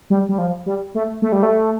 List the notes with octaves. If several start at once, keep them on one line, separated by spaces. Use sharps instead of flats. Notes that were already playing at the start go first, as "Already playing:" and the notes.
G3
G3
F3
G3
A3
A3
G3
A3